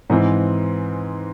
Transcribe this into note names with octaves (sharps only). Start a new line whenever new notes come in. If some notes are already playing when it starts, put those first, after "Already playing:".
G#2 E3 C4